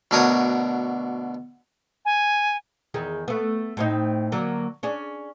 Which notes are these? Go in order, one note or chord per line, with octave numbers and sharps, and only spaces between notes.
D2 B2 D4 A#4 C#5 D#6
G#5
E2 D#3 G#4
A3 B3
A2 C4 D#4
D3 F#3 A#3
C#4 D4 G#4